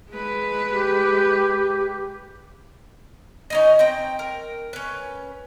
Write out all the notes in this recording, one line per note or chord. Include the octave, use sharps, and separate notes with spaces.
G#3 B4
G4
C#4 D#4 D#5
C4 G5 A#5
A#4
C#4 B4